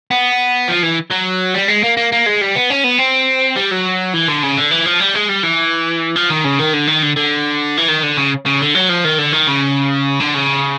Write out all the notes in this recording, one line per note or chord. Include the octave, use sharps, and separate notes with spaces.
B3
F3
E3
F#3
G3
G#3
A#3
A#3
A#3
G#3
G3
B3
C#4
B3
C4
G3
F#3
E3
D3
C#3
D3
E3
F3
G3
G#3
G3
E3
F3
D#3
C#3
D#3
D3
D#3
D3
D3
E3
D#3
D3
C#3
C#3
D3
F#3
F3
D#3
D3
D#3
C#3
D3
C#3